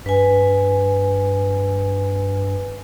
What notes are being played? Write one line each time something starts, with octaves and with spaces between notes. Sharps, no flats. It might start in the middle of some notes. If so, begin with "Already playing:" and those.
G2 B4 G#5